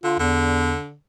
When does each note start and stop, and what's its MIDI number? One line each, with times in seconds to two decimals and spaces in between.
0.04 0.17 50
0.04 0.18 65
0.19 0.74 40
0.19 0.94 50